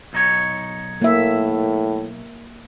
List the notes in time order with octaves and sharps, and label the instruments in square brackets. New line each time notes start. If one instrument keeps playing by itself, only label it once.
[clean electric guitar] B1 D#4 C#5
[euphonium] A2 [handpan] A#3 E5